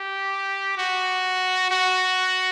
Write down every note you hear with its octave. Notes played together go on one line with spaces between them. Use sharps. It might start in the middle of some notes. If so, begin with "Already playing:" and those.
Already playing: G4
F#4
F#4